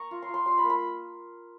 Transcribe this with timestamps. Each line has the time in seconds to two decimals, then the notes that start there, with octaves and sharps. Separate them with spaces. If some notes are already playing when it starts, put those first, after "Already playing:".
Already playing: A#3 A#5 C#6
0.11 F4
0.22 C6
0.29 F4
0.34 C6
0.46 G3 C6
0.58 B5
0.64 A#3
0.70 B5